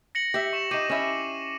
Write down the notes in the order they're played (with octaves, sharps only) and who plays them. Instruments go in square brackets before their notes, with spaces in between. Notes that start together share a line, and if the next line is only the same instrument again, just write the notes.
[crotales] A#6 C#7 F#7
[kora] G4 E5
[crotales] C#6 E7
[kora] D#4 G4 [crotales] D6 C7 D#7
[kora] C#4 E4